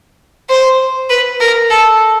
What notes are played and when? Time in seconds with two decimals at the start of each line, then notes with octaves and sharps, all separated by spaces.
0.50 C5
1.10 B4
1.40 A#4
1.70 A4